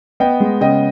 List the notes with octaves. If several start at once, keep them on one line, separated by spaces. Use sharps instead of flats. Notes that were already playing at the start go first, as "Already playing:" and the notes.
B3 D#5 G5
G#3
C#3 D#5 G5